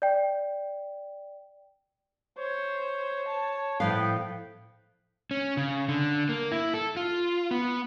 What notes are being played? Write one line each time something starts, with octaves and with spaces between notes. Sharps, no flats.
D5 G5
C5 C#5
A5
A2 F3 B3 F5 G5
C#4
C#3
D3
A#3
E4
A4
F4
B3